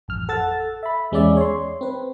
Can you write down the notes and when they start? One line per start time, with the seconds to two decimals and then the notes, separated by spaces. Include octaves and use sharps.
0.08 A1 F2 F6
0.29 A4 F#5 E6 A6
0.83 E5 B5
1.12 E2 G#3 C#4 D5 E5
1.37 C#5 C6
1.81 C4 B4